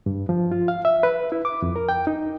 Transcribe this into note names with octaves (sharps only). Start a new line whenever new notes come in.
G2
F3
F4
F5
E5
B4
E4
D6
F2
A#4
G5
D#4